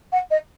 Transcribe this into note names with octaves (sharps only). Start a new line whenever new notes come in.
F#5
D#5